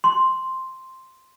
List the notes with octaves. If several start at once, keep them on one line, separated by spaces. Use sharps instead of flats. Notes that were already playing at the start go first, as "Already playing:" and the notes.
C6